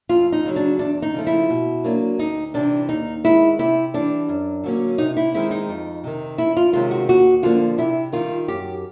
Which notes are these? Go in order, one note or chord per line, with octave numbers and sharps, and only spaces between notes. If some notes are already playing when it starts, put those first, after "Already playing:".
F2 F4
D#4
C#3 F#3
D4
E2 D4
D#4
C#3 F3 A3
E4
B2
F#3 A#3 D4
D2 D#4
C3 E3 D4
D#2 D#4
D#3 G#3 E4
C3 E4
E3 G3 D4
F#2
D3 F#3 A#3 C#4
C3 D#4
E4
D#3 G#3 C4 E4
D#4
F2
C3 D#3
E2 E4
F4
C3 D#3 G#3 C#4 F4
F#4
D#2 F#4
D3 F3 A#3 D4 F4
C3 E4
D#3 G3 F4
F#2 G4